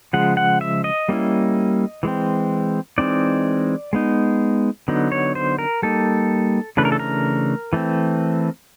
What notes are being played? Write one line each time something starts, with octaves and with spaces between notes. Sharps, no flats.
C#3 F3 G#3 F#5
F#5
E5
D#5
G3 A#3 C#4 E4
E3 G#3 C4
E3 G#3 C4 D#4 D5
G#3 B3 D#4
D3 F#3 B3 D#4
C#5
C5
A#4
G3 A#3 D#4 A4
C#3 E3 A3 D4 B4
A#4
A4
A#4
E3 A3 C4